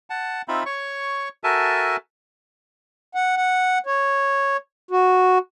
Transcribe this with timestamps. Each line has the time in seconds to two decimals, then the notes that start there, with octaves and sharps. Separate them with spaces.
0.10 F#5 A5
0.48 C4 D#4 F4 E5 B5
0.66 C#5 C#6
1.44 F#4 A4 A#4 E5 G#5 A5
3.15 F#5
3.37 F#5
3.86 C#5
4.91 F#4